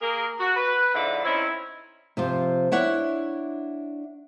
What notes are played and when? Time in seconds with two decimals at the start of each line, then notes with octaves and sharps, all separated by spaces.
0.01 A#3 G#4 A#4
0.39 F#4
0.56 B4
0.93 G#2 D3 F3 E4 D5 E5
1.25 C4 C#4 D#4 E4
2.17 C3 F3 F4
2.72 D4 E4 C#5 F#5